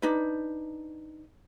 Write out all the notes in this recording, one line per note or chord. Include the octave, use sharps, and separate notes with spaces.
D4 D#4 B4